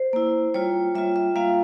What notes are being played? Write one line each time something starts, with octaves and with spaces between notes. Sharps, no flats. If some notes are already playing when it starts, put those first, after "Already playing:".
Already playing: C5
A#3 E4
G3 A#3 F4 C#5
G3 A#3 F4 E5
E5
G3 A#3 F4 F5